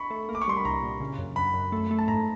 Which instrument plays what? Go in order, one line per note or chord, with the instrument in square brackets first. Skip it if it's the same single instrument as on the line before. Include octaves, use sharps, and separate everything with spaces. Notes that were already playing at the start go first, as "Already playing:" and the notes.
Already playing: [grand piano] B5 C#6
[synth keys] A3
A#3
[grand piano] D6
C#6
[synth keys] G3 [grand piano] C6
[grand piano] B5
[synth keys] C2 [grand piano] A#5
[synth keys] A#2
C#3
F#2
[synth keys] F#2 [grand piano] B5
[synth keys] F#2
A3
A3
[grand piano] A5
[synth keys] G#2 [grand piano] A#5